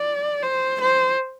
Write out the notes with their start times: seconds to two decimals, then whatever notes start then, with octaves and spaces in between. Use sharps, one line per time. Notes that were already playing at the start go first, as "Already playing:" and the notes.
Already playing: D5
0.43 C5
0.81 C5